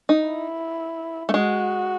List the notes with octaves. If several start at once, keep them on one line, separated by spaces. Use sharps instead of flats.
D#4
E4
A3
G#3 F#4